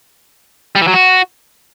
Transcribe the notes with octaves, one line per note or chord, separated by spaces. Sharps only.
G3
E3
F#3
F#4